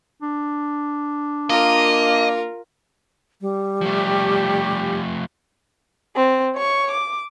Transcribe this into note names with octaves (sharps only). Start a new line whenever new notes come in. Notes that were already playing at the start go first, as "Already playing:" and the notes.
D4
A#3 F4 A#4 D#5
G3
F3 A3 G4
C4
C#5 C#6
D6